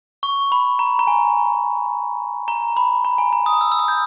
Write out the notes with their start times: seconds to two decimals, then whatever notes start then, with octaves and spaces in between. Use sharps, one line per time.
0.23 C#6
0.52 B5
0.79 A#5
0.99 A#5
1.07 G#5
2.48 A#5
2.77 B5
3.05 A#5
3.18 G#5
3.33 A#5
3.46 D#6
3.61 E6
3.72 E6
3.79 D#6
3.88 G6